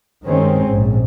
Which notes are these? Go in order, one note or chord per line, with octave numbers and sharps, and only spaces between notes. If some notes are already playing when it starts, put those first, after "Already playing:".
G2 D#3 G#3 C4 C#4
A#1 G#2